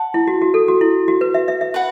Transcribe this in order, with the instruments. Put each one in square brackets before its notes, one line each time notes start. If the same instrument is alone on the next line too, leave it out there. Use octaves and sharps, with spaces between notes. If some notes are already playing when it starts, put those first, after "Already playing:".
Already playing: [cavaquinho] F#5 A5
[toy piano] E4
F#4
F#4
A4
F#4
E4
F#4
B4
E5
E5
E5
[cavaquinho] B4 F#5